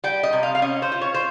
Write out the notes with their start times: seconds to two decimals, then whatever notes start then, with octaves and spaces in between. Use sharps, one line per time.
0.04 G3 G5
0.23 D#5
0.33 C3
0.43 F5
0.55 F5
0.62 C#4 D#5
0.82 C5
0.92 F4
1.01 C#5
1.14 C5